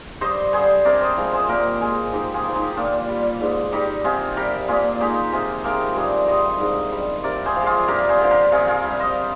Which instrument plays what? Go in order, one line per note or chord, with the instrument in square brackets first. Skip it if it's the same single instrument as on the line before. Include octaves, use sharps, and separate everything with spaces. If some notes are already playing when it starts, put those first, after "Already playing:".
[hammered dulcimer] G2 C5 D#5
D3 G3 G#4 C5
C3 A#4 D5
C5 D#5
F3 G#3
G#4 C5
A#2 G4 A#4
G#3 F4 G#4
G#2 D#4 G4
F4 G#4
F3 G#3
D#4 G4
A#2 D4 F4
G3
G#2
G3 D#4 G4
C3 F4 G#4
G3 G4 A#4
A#2 F4 G#4
G#3 D#4 G4
C3 F4 G#4
F3 G#3 G4 A#4
G2 G#4 C5
D#3 G3 C5 D#5
G#2
G3
C3 A#4 D5
G#4 C5
F3 G#3
F4 G#4
G2 G4 A#4
G#4 C5
D3 F3
G4 A#4
C3 F4 G#4
F4 G#4
G3
C5 D#5